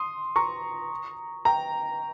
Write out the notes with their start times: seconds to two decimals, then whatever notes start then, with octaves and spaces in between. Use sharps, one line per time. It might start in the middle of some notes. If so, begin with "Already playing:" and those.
Already playing: C6 D#6
0.36 A#5 C#6
1.45 G5 A#5